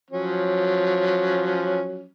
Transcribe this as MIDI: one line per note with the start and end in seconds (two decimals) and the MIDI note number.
0.11 2.09 53
0.11 2.09 54
0.11 2.09 61